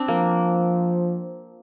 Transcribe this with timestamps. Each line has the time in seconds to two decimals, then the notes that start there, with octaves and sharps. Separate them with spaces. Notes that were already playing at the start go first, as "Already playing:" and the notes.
Already playing: C4 D4
0.08 F3 A#3